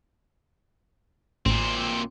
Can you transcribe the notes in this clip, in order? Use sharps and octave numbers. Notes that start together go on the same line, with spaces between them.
A1 A#2 C4